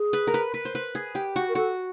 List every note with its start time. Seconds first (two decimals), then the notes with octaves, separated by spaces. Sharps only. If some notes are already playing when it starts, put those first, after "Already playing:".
Already playing: G#4
0.13 B4
0.27 A#4
0.34 B4
0.54 B4
0.65 C5
0.75 B4
0.95 G#4
1.15 G4
1.36 F#4
1.49 A#4
1.55 F#4 A4